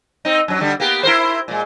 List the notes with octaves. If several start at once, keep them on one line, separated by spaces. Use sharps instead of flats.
C4 D#4
F#2 F#3
D3 G3
A#3 B3 G4
E4 A#4 C5
A#2 G#3